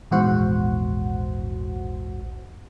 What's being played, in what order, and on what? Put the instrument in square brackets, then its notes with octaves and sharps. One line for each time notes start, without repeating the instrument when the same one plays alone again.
[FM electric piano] A#1 E2 G#2 F#4 C5 F#5